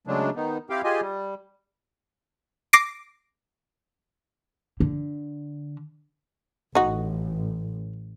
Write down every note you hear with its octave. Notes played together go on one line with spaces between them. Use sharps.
C#3 F#3 G#3 A3 D4
D#3 B3 D#4
C4 E4 G4 F5 G5
F4 G4 G#4 D#5 G#5
G3
D6 A#6 C7 D7
D3
A1 D#4 F#4